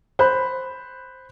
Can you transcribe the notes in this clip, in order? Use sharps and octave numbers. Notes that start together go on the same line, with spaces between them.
C5 B5 F#6